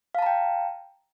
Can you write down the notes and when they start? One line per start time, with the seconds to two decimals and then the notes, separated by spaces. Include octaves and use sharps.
0.15 F5
0.18 A5
0.22 A#5
0.26 G5